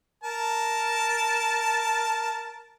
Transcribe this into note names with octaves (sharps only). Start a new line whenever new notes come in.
A#4 A5